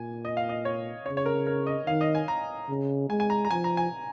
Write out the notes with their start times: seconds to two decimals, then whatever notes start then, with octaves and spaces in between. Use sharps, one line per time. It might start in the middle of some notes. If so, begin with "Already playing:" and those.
Already playing: A#2 G#5
0.25 D#5
0.37 F5
0.49 D#5
0.65 C#5
1.06 C#3 C#5
1.17 C#5
1.26 A#4
1.47 A#4
1.67 D#5
1.87 D#3 F5
2.01 D#5
2.15 G#5
2.28 A#5
2.69 C#3
3.10 G#3 G#5
3.20 G#5
3.30 A#5
3.45 A#5
3.51 F3 G#5
3.64 A#5
3.77 G#5